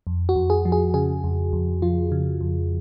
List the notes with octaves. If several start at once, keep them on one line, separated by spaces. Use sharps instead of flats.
F2
F#4
F2
G#4
F3
G#4
C#3 G#4
F2
F2
F3 F4
C#3
F2